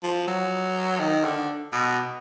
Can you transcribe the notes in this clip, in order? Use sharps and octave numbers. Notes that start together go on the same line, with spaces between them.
F3
F#3
D#3
D3
B2